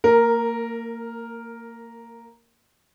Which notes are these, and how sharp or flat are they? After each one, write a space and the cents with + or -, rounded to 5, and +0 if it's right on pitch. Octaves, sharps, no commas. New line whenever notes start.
A#3 -25 A#4 +0